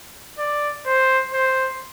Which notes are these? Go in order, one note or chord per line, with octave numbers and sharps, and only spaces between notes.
D5
C5
C5